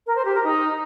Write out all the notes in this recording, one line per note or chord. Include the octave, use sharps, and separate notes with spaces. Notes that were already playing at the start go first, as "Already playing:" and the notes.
A#4
C5
G4
A#4
D#4